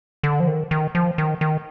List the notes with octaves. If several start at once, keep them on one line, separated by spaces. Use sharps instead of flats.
D3
F3
D#3
D#3
F3
D#3
D#3